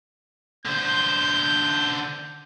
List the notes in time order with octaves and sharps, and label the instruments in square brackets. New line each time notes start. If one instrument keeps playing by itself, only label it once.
[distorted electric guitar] D3 C5 [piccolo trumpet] G6